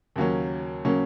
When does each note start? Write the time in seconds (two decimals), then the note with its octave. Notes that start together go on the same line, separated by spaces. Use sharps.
0.16 D#2 C#3 F#3 A#3 C#4
0.85 C#3 F#3 A#3 C#4